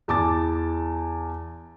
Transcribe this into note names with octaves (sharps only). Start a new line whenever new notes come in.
E2 A5 D6 A6